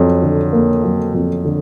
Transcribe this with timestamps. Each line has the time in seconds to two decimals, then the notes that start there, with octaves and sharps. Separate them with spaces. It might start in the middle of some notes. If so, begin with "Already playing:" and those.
Already playing: F2 F#3
0.22 D3
0.53 A#3
0.83 F#3
1.15 F2
1.45 D3